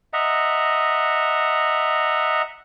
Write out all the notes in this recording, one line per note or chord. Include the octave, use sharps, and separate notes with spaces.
D#5 E5 F#5 A#5